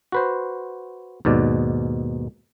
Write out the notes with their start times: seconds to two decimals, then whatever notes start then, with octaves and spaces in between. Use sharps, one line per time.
0.12 F#4 B4 C5
1.25 D#2 G#2 B2 D5